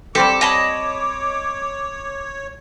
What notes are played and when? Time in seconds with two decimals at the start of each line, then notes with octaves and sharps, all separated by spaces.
0.15 G3 C4 G4 A4 D6
0.41 C#5 D#5 A5 B5